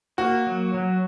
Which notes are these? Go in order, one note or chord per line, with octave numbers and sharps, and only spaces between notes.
A#3 F#4
F#3
F#3